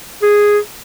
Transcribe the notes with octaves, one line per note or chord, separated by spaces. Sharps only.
G#4